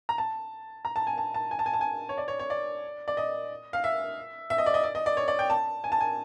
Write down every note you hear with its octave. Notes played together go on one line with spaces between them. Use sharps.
A#5
A5
A#5
A5
G#5
A5
A5
G#5
A5
G#5
A5
G#5
C#5
D5
C#5
C#5
D5
D5
D#5
F5
E5
E5
D#5
D5
D#5
D5
D#5
D5
C#5
D5
G5
A5
G#5
A5
G#5